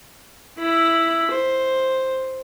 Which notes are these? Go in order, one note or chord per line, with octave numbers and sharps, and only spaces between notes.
E4 B5
C5